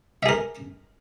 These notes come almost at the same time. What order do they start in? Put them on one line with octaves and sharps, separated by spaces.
E5 G#4 A#4